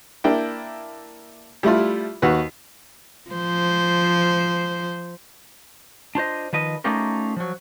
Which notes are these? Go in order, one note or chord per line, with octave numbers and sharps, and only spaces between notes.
A#3 D4 E4 G5
G3 A3 E4 F4
D#2 F#4 B4
F3 C5
D4 F4 C5 D#5
D#3 F3 B4 D#5
A3 C#4 D#4 F4 G4 A#4
F3 F#3